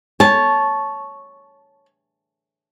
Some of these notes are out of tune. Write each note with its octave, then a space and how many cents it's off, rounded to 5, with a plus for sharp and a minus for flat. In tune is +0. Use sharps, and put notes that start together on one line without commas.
C#5 +0 A5 -15